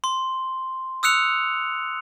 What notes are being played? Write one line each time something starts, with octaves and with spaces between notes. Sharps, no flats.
C6
D#6 E6 F#6 C#7 F7